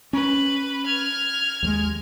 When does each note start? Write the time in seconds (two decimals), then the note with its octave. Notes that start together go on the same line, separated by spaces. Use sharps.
0.13 C#4 B4
0.85 F6 G#6
1.63 D#2 G3 G#3